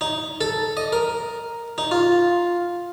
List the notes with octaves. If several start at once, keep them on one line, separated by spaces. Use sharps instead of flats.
D#4
A4
D#5
A#4
D#4
F4